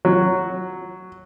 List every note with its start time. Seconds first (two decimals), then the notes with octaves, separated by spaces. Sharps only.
0.05 F#3